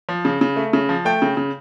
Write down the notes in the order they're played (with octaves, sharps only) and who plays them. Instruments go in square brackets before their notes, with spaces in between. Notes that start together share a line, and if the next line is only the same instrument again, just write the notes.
[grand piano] F3
C#3
C#3
A3
C#3
F3
A3 G5
C#3
C#3